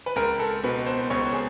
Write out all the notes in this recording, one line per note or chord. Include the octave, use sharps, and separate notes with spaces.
B4
C#2 A#4
A4
B2 B4
C5
C#2 C#5
G#4